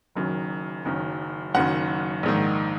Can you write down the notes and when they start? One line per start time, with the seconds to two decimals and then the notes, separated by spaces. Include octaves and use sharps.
0.16 F#1 F#2 D#3
0.85 F#1 F#2 D#3
1.54 F#1 F#2 D#3 F#5
2.23 A#1 G#2 D#3